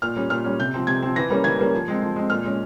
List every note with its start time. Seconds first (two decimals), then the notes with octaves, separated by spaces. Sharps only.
0.02 A#2 F6
0.16 G3 C#4
0.30 A#2 F6
0.44 G3 C#4
0.59 C3 G6
0.74 F3 C4
0.87 C3 G#6
1.02 F3 C4
1.16 E3 A#6
1.30 G3 A#3 C#4
1.44 E3 G#6
1.59 G3 A#3 C#4
1.73 F3
1.88 G#3 C4
2.02 F3
2.16 G#3 C4
2.30 A#2 F6
2.45 G#3 C#4